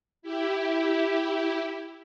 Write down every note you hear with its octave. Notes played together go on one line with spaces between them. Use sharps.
E4 G4